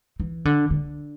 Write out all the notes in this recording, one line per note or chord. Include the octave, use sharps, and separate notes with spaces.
E3
D3
D3